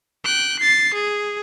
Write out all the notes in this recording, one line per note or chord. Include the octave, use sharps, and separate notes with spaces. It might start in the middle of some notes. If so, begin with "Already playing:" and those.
G5 F#6
A6 C7
G#4